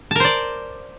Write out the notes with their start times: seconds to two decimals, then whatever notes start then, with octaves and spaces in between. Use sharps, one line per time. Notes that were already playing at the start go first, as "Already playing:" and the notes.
0.11 A5
0.15 A#4
0.20 C5
0.25 D5